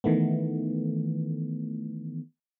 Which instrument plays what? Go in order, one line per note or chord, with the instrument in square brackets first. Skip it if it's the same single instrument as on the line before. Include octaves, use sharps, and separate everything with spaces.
[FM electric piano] D#3 E3 A3 B3